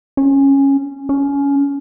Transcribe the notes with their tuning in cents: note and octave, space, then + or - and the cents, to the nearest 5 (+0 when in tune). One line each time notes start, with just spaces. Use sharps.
C#4 -10
C#4 +20